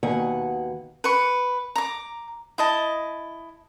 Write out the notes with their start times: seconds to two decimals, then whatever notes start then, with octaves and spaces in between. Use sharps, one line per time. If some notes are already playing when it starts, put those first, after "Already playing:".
0.03 D#2 B2 D#3 F#5 G#5
1.04 B4 C#6
1.76 A#5 D6
2.58 E4 D#5 A5